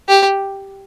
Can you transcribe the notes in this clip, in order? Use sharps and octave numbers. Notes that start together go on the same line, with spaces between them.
G4